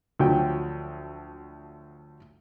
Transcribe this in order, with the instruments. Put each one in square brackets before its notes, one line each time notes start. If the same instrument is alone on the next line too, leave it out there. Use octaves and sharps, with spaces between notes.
[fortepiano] D2 F3 F#3 G5